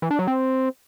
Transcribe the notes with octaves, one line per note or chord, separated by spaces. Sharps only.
E3
D4
F#3
C4